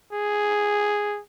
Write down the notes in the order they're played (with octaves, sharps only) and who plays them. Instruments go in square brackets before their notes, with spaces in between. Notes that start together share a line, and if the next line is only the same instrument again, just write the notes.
[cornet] G#4